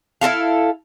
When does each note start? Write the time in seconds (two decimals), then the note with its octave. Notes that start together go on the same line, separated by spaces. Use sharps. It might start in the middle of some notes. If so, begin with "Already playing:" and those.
0.21 E4 F#4 A4 F5